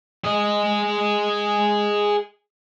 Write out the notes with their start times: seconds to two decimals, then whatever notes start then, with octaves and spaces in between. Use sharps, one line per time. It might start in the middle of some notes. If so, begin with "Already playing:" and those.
0.24 G#4 D#5